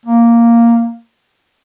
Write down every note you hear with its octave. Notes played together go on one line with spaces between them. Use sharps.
A#3